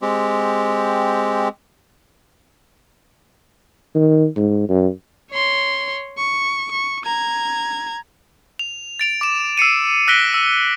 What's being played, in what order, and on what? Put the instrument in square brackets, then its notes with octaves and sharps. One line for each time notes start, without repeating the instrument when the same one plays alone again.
[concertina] G#3 C4 G4
[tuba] D#3
G#2
F#2
[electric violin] C#5 C6
C#6
C#6
A#5 G#6
[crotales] F7
A6 D7 F7
D6 E7
E6 C7 C#7 D#7
E6 F#6 A#6 B6 D7 G7
E6